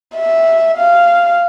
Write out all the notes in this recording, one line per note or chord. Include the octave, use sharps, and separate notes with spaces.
E5
F5